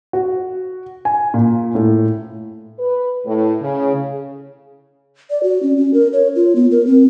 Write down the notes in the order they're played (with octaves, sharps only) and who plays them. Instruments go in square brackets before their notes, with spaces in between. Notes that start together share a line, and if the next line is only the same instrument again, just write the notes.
[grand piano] F#4
G#5
A#2
A2
[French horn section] B4
A2
C#3
[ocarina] D5
F#4
C#4
C#4
A#4
C#5
F4
B3
A#4
C4